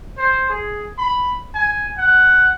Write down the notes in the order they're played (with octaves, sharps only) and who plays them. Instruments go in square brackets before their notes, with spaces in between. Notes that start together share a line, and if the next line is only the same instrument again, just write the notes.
[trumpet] C5
G#4
B5
G#5
F#5